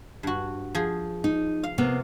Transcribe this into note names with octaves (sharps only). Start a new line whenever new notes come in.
G2 F#4
F3 G#4
D#4
F5
C3 A#3 B3